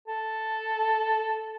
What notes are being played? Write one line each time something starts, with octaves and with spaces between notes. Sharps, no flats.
A4